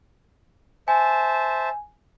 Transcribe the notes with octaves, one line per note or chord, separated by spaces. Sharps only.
C5 E5 G#5 A5